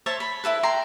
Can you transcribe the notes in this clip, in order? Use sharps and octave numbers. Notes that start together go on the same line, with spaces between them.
C5 C#5 E5 A5
B5
E4 F4 A4 B4
G5 A5 A#5 C6